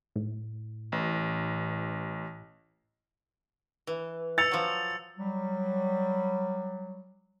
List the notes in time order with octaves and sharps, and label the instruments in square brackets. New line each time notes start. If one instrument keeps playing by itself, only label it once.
[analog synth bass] A2
[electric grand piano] A1
[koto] E3
[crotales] E6 C#7 F7 [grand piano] A6
[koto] F3 F#3
[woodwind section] F#3 G3